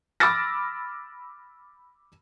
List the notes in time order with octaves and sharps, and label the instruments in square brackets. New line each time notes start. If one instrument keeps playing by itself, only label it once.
[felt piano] B5 D6 E6 F6 A6 A#6